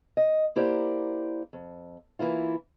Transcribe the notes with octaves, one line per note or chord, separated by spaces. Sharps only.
D#5
A#3 E4 G4 A#4 C5 D5
F2
E3 A#3 E4 F4